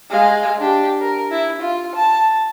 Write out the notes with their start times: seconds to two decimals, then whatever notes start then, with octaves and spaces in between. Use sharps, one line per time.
0.10 G#3 F5
0.59 D4 G4
1.01 A#4
1.31 E4
1.61 F4
1.95 A5